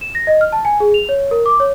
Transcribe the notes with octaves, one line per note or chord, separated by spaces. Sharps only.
E7
A#6
D#5
F6
A5
G#5
G#4
F7
C#5
A#4
D6
C#5